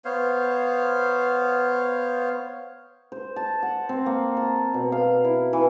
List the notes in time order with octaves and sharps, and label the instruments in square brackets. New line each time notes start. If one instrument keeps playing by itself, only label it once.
[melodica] B3 C5 C#5 F5
[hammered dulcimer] C5
A5
F#5
C4
A#3
A5
B2
F5
E4
E3